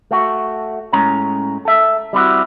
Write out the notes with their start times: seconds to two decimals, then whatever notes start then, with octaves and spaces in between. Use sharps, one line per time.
0.11 A3 F#4
0.93 A2 G#3 C#4 A#5
1.65 A4 E5
2.13 G3 C4 E4 F#4